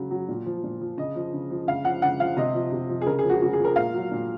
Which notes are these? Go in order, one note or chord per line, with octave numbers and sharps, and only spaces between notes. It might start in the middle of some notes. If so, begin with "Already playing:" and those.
Already playing: C#3 F#3
F#3
A#2
F3
A#2
F3
C#3 D#5
F3
C#3
F3
C#3 F5
F3 F#5
C#3 F#5
F3 F5
C3 D#5
F3
C3
F3
G#4
C#3 A#4
G#4
F3
F#4
C#3 F#4
G#4
F3
A#4
A#2 F5
F#3
A#2